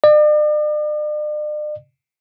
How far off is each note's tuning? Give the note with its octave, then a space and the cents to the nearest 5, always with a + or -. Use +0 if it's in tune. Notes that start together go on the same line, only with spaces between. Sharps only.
D5 +45